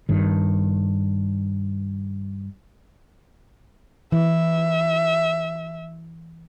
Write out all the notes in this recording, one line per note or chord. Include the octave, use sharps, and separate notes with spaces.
G2 D#3
E3 E5